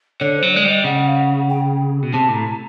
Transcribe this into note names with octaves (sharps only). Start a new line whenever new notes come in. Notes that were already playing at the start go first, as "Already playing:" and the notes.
D3 C#5
C5
F#3
G#3 D5
G3 D#5
C#3 F#5
F5
F#5
G5
B2
C3 A5
A2
A#5